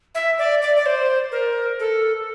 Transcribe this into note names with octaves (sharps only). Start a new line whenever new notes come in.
E5
D5
D5
D5
C5
A#4
A4